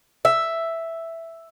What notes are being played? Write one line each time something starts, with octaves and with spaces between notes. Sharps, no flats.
E5